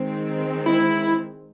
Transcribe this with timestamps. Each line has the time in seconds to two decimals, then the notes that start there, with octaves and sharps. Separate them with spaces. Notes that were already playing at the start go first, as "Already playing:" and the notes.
Already playing: D#3 G#3 C4
0.66 E4